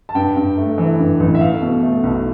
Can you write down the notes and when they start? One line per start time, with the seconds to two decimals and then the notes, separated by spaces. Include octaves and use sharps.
0.09 A5
0.15 G2 G5
0.36 G2
0.57 A3
0.78 E3
0.99 G2
1.20 A1
1.35 E5
1.41 A3 F5
1.62 B2
1.83 A3
2.03 B1